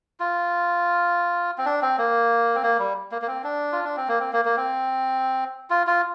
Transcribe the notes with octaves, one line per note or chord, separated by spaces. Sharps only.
F4
C4
D4
C4
A#3
C4
A#3
G3
A#3
A#3
C4
D4
F4
D4
C4
A#3
C4
A#3
A#3
C4
F4
F4